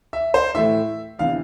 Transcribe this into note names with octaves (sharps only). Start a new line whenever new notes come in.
E5
C5
A2 E3 A3 E4 E5
C3 E3 B3 D4 F5